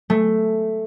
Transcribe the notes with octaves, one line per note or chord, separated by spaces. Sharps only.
A3